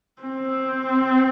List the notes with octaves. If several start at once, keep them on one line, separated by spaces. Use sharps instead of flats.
C4